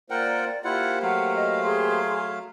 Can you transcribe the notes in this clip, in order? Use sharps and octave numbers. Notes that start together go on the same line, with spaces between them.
A#3 F4 A#4 C5 D5 F#5 G5
A#3 E4 F4 G4 C5 F#5
F#3 A3 F5 F#5
D#5
G#4 C6